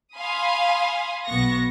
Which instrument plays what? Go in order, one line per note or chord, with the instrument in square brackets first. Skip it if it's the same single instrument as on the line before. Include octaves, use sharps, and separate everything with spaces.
[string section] F5 G#5 B5 C6 D#6
B1 B3 C#6 A#6